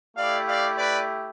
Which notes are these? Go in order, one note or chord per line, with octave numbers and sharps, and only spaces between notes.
A3 E4 G4 D5 F5
D5 F5
B4 D5